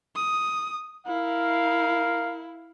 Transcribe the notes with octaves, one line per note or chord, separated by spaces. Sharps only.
D#6
E4 A#4 F5